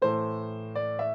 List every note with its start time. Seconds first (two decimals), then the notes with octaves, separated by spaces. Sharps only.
0.02 A2 E3 A3 C5
0.76 D5
0.99 E5